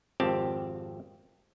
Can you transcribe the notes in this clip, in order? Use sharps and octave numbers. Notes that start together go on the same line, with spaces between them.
G#1 F2 C4 G4 A5